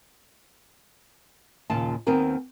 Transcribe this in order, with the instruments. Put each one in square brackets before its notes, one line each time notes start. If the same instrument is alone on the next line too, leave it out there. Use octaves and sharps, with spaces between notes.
[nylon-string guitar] D#2 A#2 C#3 F4 A5
D#2 D#3 B3 C4 A#4 G#5